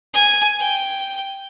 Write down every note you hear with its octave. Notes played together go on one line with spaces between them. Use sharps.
G#5
G5